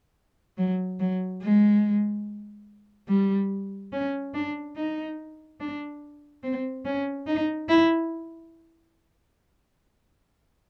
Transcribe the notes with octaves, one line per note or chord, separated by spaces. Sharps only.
F#3
F#3
G#3
G3
C#4
D4
D#4
D4
C4
C#4
D#4
E4